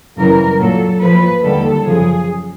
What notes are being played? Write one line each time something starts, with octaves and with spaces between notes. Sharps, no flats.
F#2 C#3 E3 G3 A#4
A#2 F#3 A4
A#2 F3 B4
D#2 D3 G3 A4
F#2 C#3 F3 G#4